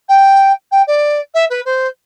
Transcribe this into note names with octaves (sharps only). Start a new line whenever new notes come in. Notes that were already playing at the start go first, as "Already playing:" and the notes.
G5
G5
D5
E5
B4
C5